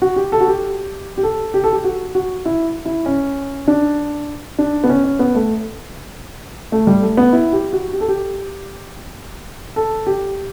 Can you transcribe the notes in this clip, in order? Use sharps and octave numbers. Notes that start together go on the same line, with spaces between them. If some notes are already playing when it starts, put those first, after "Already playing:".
F#4
G4
A4
F#4
G4
G4
A4
G4
A4
G4
F#4
F#4
E4
E4
C#4
D4
D4
B3
C#4
C#4
B3
A3
A3
G3
A3
B3
E4
G4
F#4
G4
A4
G4
A4
G4